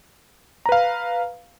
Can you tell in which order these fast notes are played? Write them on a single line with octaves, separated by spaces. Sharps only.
A#5 B4 F5